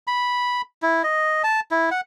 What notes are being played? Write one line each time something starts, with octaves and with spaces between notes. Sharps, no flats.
B5
E4
D#5
A5
E4
F#5